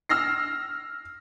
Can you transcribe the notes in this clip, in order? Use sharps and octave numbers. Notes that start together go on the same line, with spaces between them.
E6 F6 A#6 C7